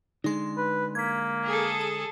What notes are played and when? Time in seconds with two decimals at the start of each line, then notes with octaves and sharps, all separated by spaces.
0.24 D3 G#3 D#4 C6
0.57 B4
0.95 A#3 G#6 B6
1.45 G#4 A4
1.81 A5